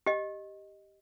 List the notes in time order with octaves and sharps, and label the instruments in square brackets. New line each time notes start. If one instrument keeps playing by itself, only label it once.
[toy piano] G4 D#5